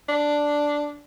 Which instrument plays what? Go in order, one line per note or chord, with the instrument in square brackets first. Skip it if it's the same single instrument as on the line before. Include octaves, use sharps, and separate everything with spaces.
[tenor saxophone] D4